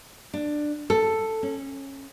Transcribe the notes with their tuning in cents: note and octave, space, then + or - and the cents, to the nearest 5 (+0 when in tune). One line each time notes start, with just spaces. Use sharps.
D4 +15
A4 +5
C#4 -20